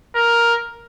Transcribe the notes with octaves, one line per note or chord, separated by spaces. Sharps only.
A#4